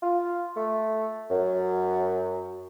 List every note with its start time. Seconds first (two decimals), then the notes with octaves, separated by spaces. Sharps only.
0.02 F4
0.56 A3
1.31 F#2